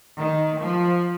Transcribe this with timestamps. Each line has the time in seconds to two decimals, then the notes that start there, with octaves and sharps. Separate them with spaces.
0.19 D#3
0.61 F3